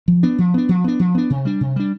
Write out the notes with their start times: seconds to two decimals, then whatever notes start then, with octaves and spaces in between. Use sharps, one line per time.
0.08 F3
0.23 B3 D4
0.38 F3
0.54 B3 D4
0.69 F3
0.84 B3 D4
0.99 F3
1.15 B3 D4
1.30 C3
1.45 G3 D4
1.61 C3
1.76 G3 D4